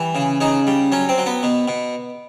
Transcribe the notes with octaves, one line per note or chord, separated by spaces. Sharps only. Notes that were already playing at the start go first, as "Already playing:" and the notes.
Already playing: E3 G3
C#3
C#3 D#4
G3
F#3 C#4
C4
F#3
B3
B2
B2